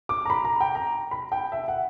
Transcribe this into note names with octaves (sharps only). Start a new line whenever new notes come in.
D6
A#5
B5
A#5
G5
A#5
B5
G5
E5
F#5